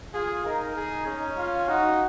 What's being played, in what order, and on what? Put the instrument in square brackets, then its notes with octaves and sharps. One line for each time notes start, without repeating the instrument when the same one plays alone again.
[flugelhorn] F4 [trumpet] G#4
[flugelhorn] D#4 [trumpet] A#4
[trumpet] G#4
C#4
[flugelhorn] F4
[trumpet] D#4 [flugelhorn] F#4